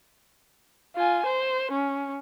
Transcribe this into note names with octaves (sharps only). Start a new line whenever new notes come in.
F4 G#5
C5
C#4